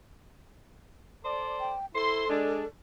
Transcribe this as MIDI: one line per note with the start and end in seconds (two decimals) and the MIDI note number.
1.24 1.74 69
1.24 1.74 72
1.24 1.74 74
1.60 1.86 79
1.94 2.28 64
1.94 2.66 69
1.94 2.28 72
1.94 2.28 84
2.28 2.64 56
2.28 2.64 62